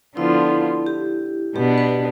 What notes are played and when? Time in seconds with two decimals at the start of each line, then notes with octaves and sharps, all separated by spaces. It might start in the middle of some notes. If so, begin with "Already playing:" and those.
0.17 D3 F3 B3 E4 F4
0.86 G4
1.56 B2 B3 D4 G4
1.78 B4